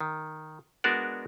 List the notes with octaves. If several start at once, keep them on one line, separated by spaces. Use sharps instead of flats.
D#3
G#3 B3 D4 F#4 A#4 D5